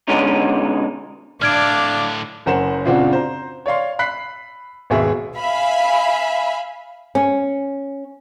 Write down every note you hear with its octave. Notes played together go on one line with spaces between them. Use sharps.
B2 D3 G#3 B3 C#4 D#4
A2 D3 D4 D5 F5 F6 G#6 D7
F#1 C#4 A#4 C5 F#5 E7
A#2 C#3 C4 D4 F4 F#4
C5 A#5
C#5 D5 F5 C6
B5 F#6 B6 C7
G#1 D#2 B2 G#4 E5
E5 F5 G#5 B5
C#4